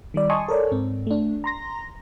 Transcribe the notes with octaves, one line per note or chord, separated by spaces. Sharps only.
D#3 G3 D5
D#5 G#5 A5 C6 C#6 D#6
A4 A#4 C#5 D5
G#2 C4
A3 D4
A#5 C6 A#6